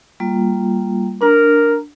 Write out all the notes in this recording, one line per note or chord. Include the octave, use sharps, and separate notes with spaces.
G3 A#3 F4
D4 A#4